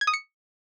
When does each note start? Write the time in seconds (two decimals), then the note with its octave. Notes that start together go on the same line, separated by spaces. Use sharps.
0.01 G#6
0.07 D#6
0.13 C#7